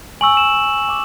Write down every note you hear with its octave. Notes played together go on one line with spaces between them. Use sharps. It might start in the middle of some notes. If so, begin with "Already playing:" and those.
G#5 C#6 E6 F#7
E7
G#5 D6